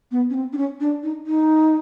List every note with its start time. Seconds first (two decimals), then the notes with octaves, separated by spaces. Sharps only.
0.11 B3
0.30 C#4
0.34 C4
0.53 D4
0.58 C#4
0.80 D4
1.03 D#4
1.27 D#4